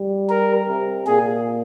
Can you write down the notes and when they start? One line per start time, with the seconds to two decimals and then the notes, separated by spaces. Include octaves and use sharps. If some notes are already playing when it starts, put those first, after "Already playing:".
Already playing: G3
0.30 A#4
0.68 C3
1.07 A#2 G#4